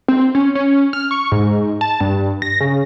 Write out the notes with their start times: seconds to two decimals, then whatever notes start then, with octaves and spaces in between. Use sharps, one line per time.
0.08 C4
0.35 C#4
0.55 C#4
0.93 F6
1.11 C#6
1.32 G#2
1.81 A5
2.00 G2
2.42 A#6
2.61 C#3